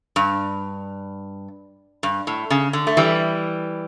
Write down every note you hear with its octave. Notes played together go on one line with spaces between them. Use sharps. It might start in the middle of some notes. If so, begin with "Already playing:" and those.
G2
G2
A2
C#3
D3
A3
E3 G3